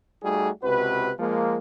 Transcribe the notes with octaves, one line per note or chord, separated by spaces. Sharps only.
G3 A3 D#4 F#4 G#4
C#2 C3 F#4 B4
F3 G#3 A#3